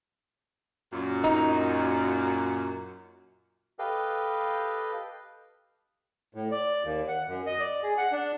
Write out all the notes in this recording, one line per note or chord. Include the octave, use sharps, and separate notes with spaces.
F#2 A#2
D#4
G4 A4 B4 D#5 F5 G5
A2
D5
D#2
F#5
F#2
D#5
D5
G#4
F#5
D4